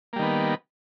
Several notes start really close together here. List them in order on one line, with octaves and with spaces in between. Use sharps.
A#3 G3 D#3 B3